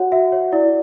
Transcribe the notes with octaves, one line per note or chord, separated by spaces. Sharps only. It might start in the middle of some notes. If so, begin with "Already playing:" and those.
Already playing: F#4 C#5 F#5
F#4 E5
C#5
E4 D5